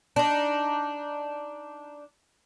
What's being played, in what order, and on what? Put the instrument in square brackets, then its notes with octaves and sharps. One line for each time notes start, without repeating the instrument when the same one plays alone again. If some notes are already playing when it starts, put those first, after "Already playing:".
[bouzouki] D4 D#4